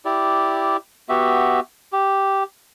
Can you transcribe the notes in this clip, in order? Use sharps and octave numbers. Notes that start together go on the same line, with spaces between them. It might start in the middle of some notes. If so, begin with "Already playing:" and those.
E4 G4 D5
B3 F#4 G4 E5
G4